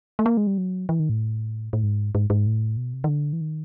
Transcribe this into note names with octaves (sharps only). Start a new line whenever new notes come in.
A3
A#3
G#3
G3
F#3
E3
D#3
A2
A2
G#2
G#2
G#2
A2
B2
C3
D#3
D3
E3
D#3